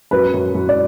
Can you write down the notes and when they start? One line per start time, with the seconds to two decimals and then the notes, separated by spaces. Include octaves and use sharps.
0.11 F#2 B4
0.33 F#2
0.54 F#2
0.69 D5